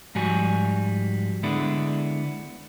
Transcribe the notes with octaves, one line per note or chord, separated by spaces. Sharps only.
G#2 F3 G3 F#4 G#5
D3 G#3 B3 D4 E4